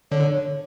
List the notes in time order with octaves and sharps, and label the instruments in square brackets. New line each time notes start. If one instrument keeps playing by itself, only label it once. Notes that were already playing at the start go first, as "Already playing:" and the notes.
[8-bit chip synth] D3 [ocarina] C#5